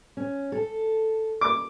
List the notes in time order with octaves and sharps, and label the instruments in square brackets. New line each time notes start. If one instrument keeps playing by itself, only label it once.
[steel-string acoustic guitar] C#4
A4
[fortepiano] D6